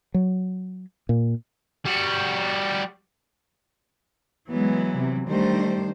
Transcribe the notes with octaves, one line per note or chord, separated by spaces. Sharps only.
F#3
A#2
G3 F#4
E3 F#3 G#3 B3
C3
D#3 G3 A3 D4 C5